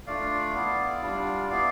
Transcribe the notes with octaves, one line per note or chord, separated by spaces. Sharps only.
A3 D4 F4 D5 F5
B3 E4
G3 D4 F4
B3 E4